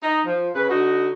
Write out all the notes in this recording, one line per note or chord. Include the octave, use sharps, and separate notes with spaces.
D#4
F3
C#3 B4
D3 D#4 F#4